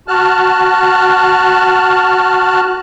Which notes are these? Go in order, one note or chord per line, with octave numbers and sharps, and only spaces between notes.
F#4 A5 F6 F#6